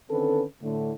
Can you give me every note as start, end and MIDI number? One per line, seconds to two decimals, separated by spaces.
0.11 0.43 50
0.11 0.43 51
0.11 0.43 60
0.11 0.43 61
0.11 0.43 69
0.11 0.43 71
0.63 0.93 45
0.63 0.93 50